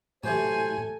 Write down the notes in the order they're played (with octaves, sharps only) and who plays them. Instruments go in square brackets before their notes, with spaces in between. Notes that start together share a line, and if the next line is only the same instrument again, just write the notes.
[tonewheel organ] A2 [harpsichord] C3 E3 F#3 [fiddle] A4 G#5 [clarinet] C5